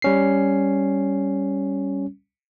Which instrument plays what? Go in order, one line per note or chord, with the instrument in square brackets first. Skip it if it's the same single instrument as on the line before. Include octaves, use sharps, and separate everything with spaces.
[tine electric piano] G3 C#4 C7